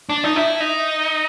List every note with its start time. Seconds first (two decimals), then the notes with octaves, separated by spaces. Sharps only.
0.09 D4
0.24 D#4
0.36 E4
0.60 D#4